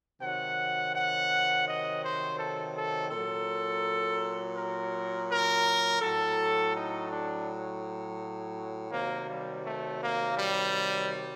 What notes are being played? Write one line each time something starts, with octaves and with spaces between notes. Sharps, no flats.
C3 D#3 F#3 F#5
F#5
D#5
C5
A4
A4
A#2 F#3 A4
A#4
A#4
A2 F#3 A4
D#4
D4
C3 D#3 F#3 A#3
G3
A3
A#3
G3